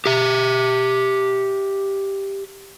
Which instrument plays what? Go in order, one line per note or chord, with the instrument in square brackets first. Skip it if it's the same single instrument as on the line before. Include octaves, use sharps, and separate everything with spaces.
[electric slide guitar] G4 E5